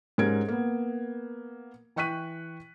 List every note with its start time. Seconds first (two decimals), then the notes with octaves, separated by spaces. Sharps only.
0.18 G#2 C#4 G4 A#4 G#6 D7
0.48 A#3 B3
1.96 E3 G5 C#6 F#6 B6 D#7